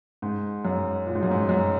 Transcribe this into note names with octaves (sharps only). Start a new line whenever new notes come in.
G#2
F#2
A#2
G#2
F#2
G#2
F#2